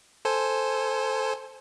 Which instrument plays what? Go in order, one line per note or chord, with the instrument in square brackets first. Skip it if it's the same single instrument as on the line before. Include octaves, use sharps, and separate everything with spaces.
[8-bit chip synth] A4 C5 G#5